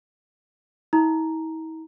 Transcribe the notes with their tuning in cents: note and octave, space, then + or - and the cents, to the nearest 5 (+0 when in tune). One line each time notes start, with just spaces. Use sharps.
E4 -45 A#5 +0